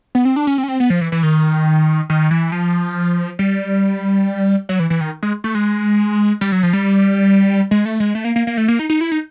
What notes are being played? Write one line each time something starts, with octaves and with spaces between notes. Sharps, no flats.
B3
C4
D4
C#4
C4
C#4
C4
B3
F3
E3
E3
D#3
D#3
E3
F3
G3
F#3
E3
E3
D#3
G#3
A3
G#3
G3
F#3
F3
G3
G#3
A3
G#3
A3
A#3
A#3
A#3
A3
A#3
D#4
D#4
E4
D#4